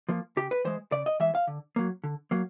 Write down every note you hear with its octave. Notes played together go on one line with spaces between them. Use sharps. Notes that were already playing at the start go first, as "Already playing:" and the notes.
F3 A#3
C#3 G4
B4
E3 G#3 C5
C#3 D5
D#5
E3 G#3 E5
F5
D3
F#3 A#3
D3
F#3 A#3